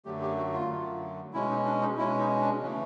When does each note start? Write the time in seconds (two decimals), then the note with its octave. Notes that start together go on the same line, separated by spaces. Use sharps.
0.05 F#2 D3 F#3 A3 G4
0.21 G4
0.37 F#4
0.53 F4
0.69 F#2 D3 F#3 A3
1.33 B2 G#3 C#4 E4
1.50 D#4
1.65 D4
1.81 D#4
1.97 B2 G#3 C#4 E4
2.19 D#4
2.41 D4
2.62 C#3 E3 A3 C#4